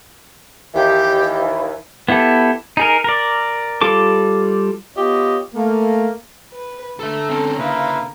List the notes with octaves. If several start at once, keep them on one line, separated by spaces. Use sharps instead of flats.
D#2 E3 G4
B3 E4 G4 A4
D#4 G#4 A#4
A#4 D5
G3 F4 A4 D6
B3 F4 G4 C#5 D#5
A3 A#3
B4
D3 A4 E5 A#5
C4 C#4 A4
C#3 A#3 E4 F4 B4